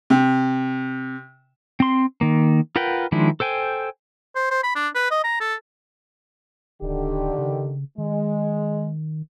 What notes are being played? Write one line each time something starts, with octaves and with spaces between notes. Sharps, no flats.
C3
C4 C6
D#3 A#3
F4 A#4 B4 F#5 G5
D#3 F3 G#3 D4 E4
A4 C5 G5 G#5
C5
C5
B5
D4
B4
D#5
A#5
A4
D1 D3 D#3 G4
C#3
D#3 G#3